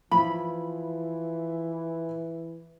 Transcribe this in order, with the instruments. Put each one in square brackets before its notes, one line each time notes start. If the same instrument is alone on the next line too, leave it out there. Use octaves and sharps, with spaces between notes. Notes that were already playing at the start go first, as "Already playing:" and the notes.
[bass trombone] E3 [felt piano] F3 E4 [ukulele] B5